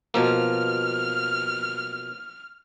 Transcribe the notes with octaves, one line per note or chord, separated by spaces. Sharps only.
B2 F3 A#3 F6